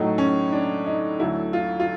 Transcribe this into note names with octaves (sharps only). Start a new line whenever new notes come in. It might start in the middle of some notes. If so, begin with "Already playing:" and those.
Already playing: A2 F#3 A3 D#4
C#4
D4
D#4
D2 D3 F#3 A3 E4
F4
F4